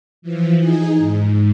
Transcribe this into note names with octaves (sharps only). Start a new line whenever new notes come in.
E3 F3
D#4 G#4
G#2